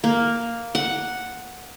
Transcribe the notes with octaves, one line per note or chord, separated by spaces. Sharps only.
A#3
F#5